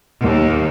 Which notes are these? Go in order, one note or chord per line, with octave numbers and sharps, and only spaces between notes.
D#2